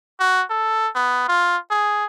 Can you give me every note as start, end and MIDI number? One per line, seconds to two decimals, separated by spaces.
0.20 0.44 66
0.50 0.89 69
0.95 1.28 59
1.28 1.58 65
1.70 2.05 68